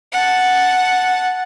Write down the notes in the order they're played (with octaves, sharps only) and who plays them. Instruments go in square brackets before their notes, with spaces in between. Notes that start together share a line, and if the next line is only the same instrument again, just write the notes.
[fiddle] F#5 A5